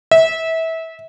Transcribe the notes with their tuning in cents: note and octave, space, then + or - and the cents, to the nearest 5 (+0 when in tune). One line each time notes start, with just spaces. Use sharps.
E5 -25